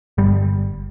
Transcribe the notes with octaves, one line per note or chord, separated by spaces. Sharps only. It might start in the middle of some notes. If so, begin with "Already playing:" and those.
G1 G3